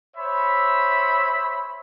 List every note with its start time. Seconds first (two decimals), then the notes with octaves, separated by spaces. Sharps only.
0.16 C5 C#5 E5 B5